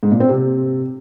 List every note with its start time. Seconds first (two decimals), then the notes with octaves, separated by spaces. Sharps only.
0.03 G#2
0.11 A#2
0.20 C4
0.29 C3